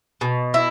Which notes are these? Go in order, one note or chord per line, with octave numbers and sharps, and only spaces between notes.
B2
E4